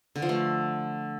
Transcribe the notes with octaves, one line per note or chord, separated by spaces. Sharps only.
D3
F3
A3